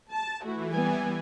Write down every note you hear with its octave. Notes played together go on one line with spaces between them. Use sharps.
A5
E3 A3 E4 F#4
G3 B3 G#5